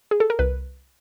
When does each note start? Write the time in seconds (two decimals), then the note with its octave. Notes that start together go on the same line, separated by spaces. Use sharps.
0.11 G#4
0.20 A4
0.30 A#4
0.39 C2 B4